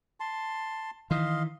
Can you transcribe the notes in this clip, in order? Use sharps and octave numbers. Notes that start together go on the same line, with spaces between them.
A5 C6
D#3 E3 D#5 F5 C6